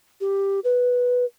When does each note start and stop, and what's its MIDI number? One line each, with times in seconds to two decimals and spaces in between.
0.21 0.60 67
0.64 1.25 71